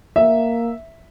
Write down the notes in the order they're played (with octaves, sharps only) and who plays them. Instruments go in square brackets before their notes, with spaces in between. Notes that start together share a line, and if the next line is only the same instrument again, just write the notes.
[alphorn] A#3 [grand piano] E5